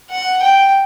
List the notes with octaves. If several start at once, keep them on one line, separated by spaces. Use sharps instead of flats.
F#5
G5